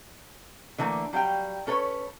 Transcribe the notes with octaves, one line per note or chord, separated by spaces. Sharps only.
D3 E3 A3 A#3
F#3 G3 F5 G5
C#4 A4 B4 C#5